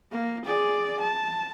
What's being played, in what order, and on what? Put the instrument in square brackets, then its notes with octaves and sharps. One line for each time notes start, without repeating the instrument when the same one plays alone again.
[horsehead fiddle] A#3
G#4 D5
A5